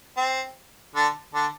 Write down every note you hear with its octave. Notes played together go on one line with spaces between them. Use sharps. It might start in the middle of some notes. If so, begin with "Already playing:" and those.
C4
D3 D4
D3 D4